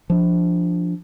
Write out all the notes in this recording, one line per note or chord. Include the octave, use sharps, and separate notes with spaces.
F3 D4